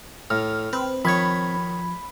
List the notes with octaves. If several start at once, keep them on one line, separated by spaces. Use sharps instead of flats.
A2 F6
C4 B4
D#3 F3 C#5 B5 G#6